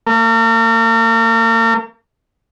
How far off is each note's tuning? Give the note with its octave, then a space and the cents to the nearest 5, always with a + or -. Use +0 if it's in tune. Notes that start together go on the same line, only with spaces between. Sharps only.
A#3 -40